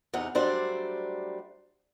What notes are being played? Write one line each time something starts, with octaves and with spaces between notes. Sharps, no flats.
E2 C3 D#4 F#5
F#3 G3 A3 D4 C5 D5